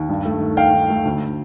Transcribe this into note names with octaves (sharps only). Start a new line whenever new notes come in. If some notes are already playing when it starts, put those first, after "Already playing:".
Already playing: D#2
G2
A3
D#3
D#3 F5 G5
D#3
A3
D2